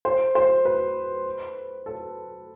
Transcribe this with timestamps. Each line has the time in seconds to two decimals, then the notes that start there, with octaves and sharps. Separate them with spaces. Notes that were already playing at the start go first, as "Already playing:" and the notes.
0.05 C5
0.35 C5
0.65 B4
1.86 A4